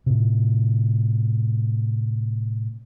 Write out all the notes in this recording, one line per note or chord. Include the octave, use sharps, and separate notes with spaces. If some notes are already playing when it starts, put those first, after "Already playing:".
A2 C3